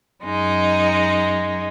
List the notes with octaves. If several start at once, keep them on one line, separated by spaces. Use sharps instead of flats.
F#2 G#3 D#4